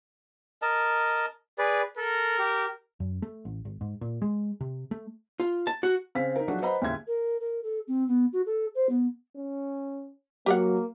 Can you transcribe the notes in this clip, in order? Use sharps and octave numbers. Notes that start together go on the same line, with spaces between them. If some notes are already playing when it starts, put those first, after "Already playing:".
A#4 D#5 A5
G#4 B4 D5
A4 A#4
G4
F#2
A3
A1
G#1
G#2
A#2
G#3
C3
A3
F4
A5
F#4
C#3 C4 F5 B6
D#4 A#4
F3 F#3 A3 D4 F#4 G#4
B4 C5 D#5 F#5 A#5 B5
D#2 A2 C#3 E5 G#6
A#4
A#4
A4
C4
B3
F#4
A4
C5
B3
C#4
F#3 A#3 G4 A#4 F#5